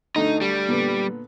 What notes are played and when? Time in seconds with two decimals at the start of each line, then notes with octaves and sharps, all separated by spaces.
0.16 D2 D3 D#4
0.41 G3
0.68 A#2 D3 B3